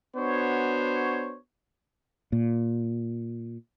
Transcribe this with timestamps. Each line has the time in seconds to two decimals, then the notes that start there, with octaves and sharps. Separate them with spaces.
0.16 B3 D4 F#4 C5 C#5
2.32 A#2